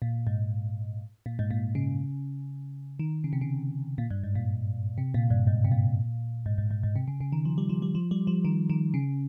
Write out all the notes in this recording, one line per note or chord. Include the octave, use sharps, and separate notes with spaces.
A#2
G#2
A#2
G#2
A#2
C#3
D#3
C#3
C3
C#3
A#2
G2
G#2
A#2
C3
A#2
G2
G#2
C3
A#2
G#2
G#2
G#2
G#2
C3
C#3
C#3
D#3
F3
G3
F3
G3
F3
G3
F3
D#3
D#3
C#3